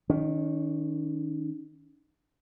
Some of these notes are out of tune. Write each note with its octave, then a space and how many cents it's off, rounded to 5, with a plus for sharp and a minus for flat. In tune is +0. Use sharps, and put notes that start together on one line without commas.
D#3 +0 C#4 +35